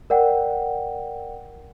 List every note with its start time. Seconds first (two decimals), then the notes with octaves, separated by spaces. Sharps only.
0.10 A#4 D5 F#5 G5